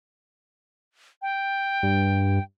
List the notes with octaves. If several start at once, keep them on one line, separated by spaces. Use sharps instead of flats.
G5
G2